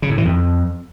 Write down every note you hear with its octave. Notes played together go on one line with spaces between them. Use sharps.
C#3
A2
E3
F2